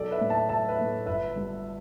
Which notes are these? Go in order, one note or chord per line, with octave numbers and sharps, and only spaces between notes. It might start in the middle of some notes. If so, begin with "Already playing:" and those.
Already playing: B1 A4 D5
B4 E5
A2 A3 D4
E5 A5
B1 E5 A5
B4 E5
A2 A3 D4
G1 B4 E5
G2 G3